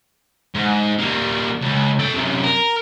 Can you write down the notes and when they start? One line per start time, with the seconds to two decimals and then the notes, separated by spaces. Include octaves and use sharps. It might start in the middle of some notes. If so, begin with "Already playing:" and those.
0.54 G#2
0.99 G3 A#3
1.61 C#2
1.99 A4 G5
2.14 F#2 C3
2.44 A#4